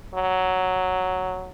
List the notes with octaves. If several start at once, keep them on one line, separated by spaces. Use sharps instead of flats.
F#3